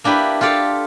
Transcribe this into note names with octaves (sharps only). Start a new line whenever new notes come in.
A#3 D4 E4 G4 B4
F4 G4 A4 D5 F5